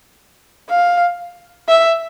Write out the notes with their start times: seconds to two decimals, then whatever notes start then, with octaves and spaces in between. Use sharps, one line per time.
0.70 F5
1.69 E5